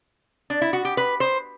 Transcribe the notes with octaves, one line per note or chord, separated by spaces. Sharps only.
D4
E4
F#4
G4
B4
C5